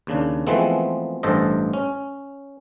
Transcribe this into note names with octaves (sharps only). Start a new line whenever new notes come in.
D#2 C#3 D4
E3 F3 G#3 A3 B3 C4
A1 G2 A4 C5 D#5
C#4